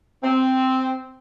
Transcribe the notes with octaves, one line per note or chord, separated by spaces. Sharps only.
C4